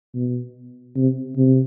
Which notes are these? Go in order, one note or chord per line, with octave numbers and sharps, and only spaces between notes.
B2
C3
C3